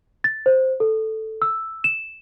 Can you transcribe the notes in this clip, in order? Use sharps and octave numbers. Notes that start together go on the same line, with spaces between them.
A6
C5
A4
E6
E7